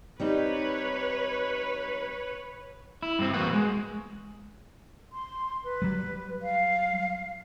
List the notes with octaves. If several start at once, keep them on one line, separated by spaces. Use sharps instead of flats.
G3 C4 D#4 B4 C#5
E4
G2 C4
E2 A2 A#3 F#4 B4 F#5
G#3
C6
B4
F#3 G3
F5